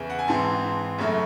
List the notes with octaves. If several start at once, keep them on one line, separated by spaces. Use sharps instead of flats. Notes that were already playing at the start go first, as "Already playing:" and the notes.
Already playing: E2 C#3 E3
F#5
G#5
G#2 E3 C4 A5
F#2 C#3 F#3 A3